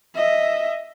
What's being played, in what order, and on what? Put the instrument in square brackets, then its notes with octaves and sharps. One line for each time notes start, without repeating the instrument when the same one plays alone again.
[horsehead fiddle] D#5 E5